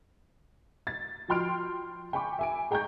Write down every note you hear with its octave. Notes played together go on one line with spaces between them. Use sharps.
A6
F3 F#4 G5 C6 F6 D7
G5 G#5 B5 C#6 D6
E5 G#5 D7
G#4 G5 A#5 C#6 G6